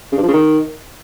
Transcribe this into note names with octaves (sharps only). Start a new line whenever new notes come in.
C#3
G2
F3
C#3
D#3